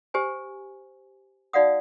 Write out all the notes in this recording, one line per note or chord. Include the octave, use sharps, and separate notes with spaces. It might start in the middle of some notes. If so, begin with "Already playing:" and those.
G4 C5 G#5
D#4 F#4 D5 F5 F#5 D#6